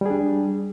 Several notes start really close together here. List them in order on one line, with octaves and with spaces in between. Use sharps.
G3 G#4 D4